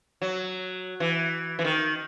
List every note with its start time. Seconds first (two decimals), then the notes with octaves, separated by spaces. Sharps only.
0.22 F#3
1.00 E3
1.59 E3
1.64 D#3